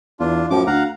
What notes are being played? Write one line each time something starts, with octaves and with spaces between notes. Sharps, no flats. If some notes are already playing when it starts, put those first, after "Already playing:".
E2 D4 F4
F#2 A2 F3 D6
D2 F5 F#5 A#5